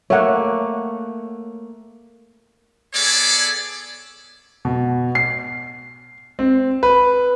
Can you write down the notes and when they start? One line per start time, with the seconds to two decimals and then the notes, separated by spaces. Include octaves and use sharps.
0.10 A3 A#3 C#5 F#5
2.94 B3 G#4 A4 C#5 D5
4.65 B2
5.15 C7
6.39 C4
6.83 B4